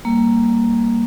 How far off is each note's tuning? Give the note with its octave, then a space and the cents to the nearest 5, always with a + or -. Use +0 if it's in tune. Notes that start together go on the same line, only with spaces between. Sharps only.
G3 +0 A#3 +0